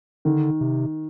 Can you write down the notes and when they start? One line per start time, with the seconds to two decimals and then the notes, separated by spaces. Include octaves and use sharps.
0.25 D3 D#3
0.61 C3